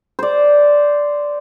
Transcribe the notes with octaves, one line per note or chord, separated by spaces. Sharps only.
C5 D5